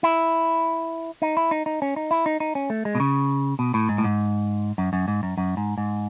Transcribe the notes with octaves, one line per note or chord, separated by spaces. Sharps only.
E4
D#4
E4
D#4
D#4
C#4
D#4
E4
D#4
D#4
C#4
A3
G#3
B2
C#3
B2
A2
G#2
A2
G#2
F#2
F#2
G#2
F#2
F#2
G#2
G#2